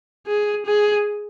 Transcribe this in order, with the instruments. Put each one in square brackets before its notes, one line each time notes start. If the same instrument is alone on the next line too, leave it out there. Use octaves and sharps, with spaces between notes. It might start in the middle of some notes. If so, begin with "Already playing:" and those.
[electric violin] G#4
G#4